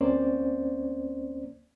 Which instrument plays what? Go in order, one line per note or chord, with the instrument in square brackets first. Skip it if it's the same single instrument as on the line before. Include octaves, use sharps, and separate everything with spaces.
[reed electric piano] D2 A#3 C4 C#4 C5 D5